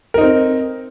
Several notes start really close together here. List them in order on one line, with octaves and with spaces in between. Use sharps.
A#4 D#4 C4